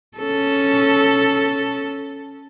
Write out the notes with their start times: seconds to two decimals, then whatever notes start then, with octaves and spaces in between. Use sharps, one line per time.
0.17 C#4 A4